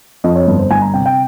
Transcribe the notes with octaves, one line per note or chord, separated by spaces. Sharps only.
F2 D#5
C#5
G1
C5
G1 G#5
A#5
C3 G5
G5